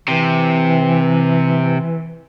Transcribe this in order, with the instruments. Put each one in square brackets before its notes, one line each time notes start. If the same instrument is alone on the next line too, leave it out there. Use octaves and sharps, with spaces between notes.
[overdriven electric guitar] C3 [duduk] E3